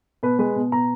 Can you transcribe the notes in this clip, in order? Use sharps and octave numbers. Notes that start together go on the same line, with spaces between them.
B2 B4
G#3 B4
B2
B2 A#5